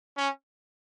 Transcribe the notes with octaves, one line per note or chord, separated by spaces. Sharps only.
C#4